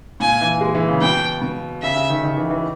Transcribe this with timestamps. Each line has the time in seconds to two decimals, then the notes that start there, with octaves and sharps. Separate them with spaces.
0.20 A#2 G#5
0.41 E3
0.61 G#3
0.75 E3
0.88 C#3
1.01 B2 G5
1.41 B2
1.82 C#3 E5
1.96 C#3
2.10 D#3
2.23 D#3
2.37 E3
2.50 E3